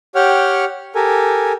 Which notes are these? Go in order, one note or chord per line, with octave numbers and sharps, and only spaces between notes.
G4 C#5 F#5 G5 F6
G4 A4 A#4 G#5